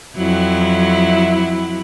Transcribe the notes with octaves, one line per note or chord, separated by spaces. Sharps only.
F2 F#3 E4